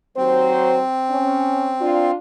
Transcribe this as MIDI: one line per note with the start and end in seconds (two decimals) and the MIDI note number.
0.17 0.82 39
0.17 0.82 54
0.17 2.11 60
0.17 0.82 72
1.10 1.70 61
1.81 2.17 62
1.81 2.17 65